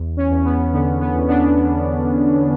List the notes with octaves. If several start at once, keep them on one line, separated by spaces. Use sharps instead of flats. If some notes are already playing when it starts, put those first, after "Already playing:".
Already playing: E2
C#4
E2
B3
D3 B3
B3
E2
B3 D4